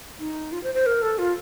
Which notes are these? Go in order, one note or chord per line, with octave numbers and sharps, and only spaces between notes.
D#4
F4
C5
C5
A#4
A4
F4